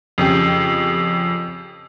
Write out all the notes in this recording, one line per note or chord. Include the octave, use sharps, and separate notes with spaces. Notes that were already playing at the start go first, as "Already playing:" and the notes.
F2 C#3 G4